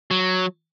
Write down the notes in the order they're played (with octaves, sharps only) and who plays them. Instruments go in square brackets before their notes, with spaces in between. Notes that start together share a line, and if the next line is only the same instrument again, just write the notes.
[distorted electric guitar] F#3